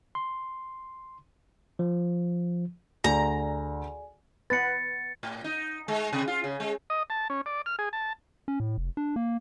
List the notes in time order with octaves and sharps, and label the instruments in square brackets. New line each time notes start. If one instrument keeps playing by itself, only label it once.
[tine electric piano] C6
F3
[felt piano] D2 [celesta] G#4 D5 G#5 [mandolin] A#5
[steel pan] B3 B4 [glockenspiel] A6 C#7
[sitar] A2
D#4
G#3
C3
F4
C#3
G#3
[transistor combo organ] D#5
A5
C#4
D5
F6
G#4
A5
[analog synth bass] C#4
A2
F1
D4
A#3